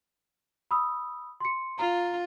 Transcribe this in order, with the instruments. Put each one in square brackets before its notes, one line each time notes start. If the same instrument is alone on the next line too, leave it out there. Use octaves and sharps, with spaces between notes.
[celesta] B5 D#6 E6
C6 C#7
[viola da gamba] F4 [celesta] A#5